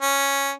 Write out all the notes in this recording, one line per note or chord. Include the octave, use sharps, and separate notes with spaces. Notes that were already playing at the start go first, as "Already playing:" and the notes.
C#4